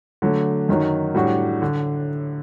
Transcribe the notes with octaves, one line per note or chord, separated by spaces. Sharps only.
D3 F#3 A3
F#2 D#3 F#3
A2 G3 D4 F#4
D3